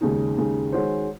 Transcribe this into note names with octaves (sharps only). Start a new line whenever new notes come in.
D#2 C#3 G#3 D#4
D#2 C#3 G#3 D#4
D#3 G#3 C#4 F#4 C5